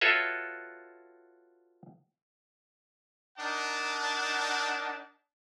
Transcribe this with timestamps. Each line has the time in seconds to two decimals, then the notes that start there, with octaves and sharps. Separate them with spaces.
0.01 F4 F#4 A4 B4 C#5 E5
3.38 D4 D#4 A#4 D5 F#5 A5